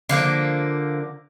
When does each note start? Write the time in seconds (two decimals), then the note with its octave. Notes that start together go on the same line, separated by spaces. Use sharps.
0.09 D3 F3 A#3